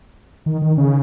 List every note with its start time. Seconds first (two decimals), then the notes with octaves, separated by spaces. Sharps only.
0.46 D#3
0.62 D#3
0.78 C#3